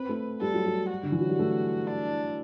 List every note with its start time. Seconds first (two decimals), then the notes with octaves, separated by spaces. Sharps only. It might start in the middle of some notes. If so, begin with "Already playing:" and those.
Already playing: C4 B4
0.09 A3
0.41 G3 A4
0.54 F#3
0.66 G3
0.90 F#4
1.03 D3
1.12 E3
1.21 F#3
1.29 G3
1.39 A3
1.87 D4